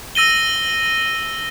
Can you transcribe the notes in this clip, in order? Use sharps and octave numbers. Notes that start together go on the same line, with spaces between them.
E6 A#6 D#7 G7